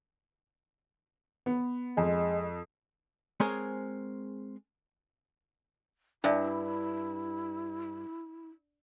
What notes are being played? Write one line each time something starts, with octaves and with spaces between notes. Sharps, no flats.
B3
F2 G#3
G#3 C4 G#4 A#4 C5 C#5
G2 D4 E4 D5 E5